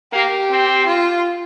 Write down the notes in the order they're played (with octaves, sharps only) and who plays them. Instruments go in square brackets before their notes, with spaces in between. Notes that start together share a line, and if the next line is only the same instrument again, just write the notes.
[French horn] A#3 [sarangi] G4
[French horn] C4
[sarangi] F4